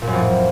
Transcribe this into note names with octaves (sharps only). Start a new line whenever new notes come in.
A#2
F#2
F2
A2